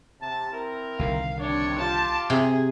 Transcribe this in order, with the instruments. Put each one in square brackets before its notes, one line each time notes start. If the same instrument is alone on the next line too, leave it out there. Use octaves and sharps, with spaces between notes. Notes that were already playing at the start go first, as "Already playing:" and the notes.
[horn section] C3 A5
C4 E4 A#4
[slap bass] C2 D3 D#3 [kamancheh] F5
[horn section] C3 C#5 [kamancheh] D4
[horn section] F4 G4 [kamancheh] A5
[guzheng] C3 [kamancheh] G#4